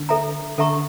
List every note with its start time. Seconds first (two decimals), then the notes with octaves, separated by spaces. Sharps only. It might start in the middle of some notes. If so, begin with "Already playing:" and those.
Already playing: D3
0.09 A4 E5 A#5
0.58 D3 A4 E5 A#5 C#6